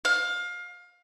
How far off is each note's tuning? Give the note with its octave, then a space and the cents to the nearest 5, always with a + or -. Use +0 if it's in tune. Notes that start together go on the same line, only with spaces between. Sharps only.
F5 +25